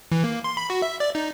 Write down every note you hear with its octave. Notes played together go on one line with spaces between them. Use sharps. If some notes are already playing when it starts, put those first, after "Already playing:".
E3
A#3
C6
B5
F#4
E5
D5
D#4